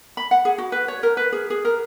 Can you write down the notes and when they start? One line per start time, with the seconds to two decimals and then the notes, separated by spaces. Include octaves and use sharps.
0.17 B5
0.31 F#5
0.45 G#4
0.58 F#4
0.72 B4
0.88 C#5
1.03 A#4
1.17 B4
1.32 G#4
1.50 G#4
1.65 A#4